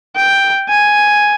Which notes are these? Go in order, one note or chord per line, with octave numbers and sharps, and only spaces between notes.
G5
G#5